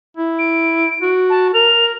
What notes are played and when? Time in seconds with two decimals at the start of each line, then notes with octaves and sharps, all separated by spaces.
0.17 E4
0.39 D7
1.02 F#4
1.30 A5
1.54 A#4 F7